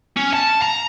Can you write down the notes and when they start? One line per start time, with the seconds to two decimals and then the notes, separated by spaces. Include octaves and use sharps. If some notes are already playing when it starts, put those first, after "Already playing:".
0.17 C#4
0.33 A5
0.62 A#5